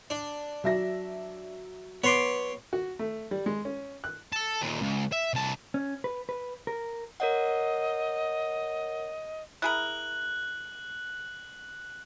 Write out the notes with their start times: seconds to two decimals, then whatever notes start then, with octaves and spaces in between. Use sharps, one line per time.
0.10 D4
0.64 F#3 E5 A#6
2.04 B3 C#5 C6 D6
2.73 F#4
2.99 A3
3.31 G3
3.46 G#3
3.65 C#4
4.04 F#6
4.33 A4 A5
4.62 D#2 A#2
4.81 C#2
5.12 E5
5.34 C2 A5
5.74 C#4
6.04 B4
6.29 B4
6.67 A#4
7.20 A#4 C#5 D#5 F#5
9.62 E4 G#4 A#4 F#6 F#7